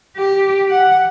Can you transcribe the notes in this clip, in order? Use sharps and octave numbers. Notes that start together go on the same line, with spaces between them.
G4
F#5